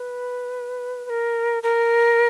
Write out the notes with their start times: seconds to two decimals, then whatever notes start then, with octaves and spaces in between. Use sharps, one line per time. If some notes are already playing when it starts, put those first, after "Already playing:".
Already playing: B4
1.05 B4
1.10 A#4
1.63 A#4